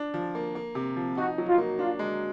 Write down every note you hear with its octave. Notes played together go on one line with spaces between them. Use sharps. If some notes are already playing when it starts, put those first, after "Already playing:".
Already playing: D4
F3
A#3
A#3
C3
F3
D#4 F#4
F#3
F4
A#3
D4 F4
G#3